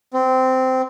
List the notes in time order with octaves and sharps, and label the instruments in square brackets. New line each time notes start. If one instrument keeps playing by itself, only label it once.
[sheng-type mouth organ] C4